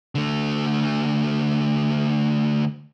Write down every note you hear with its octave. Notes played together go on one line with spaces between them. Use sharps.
D3 A3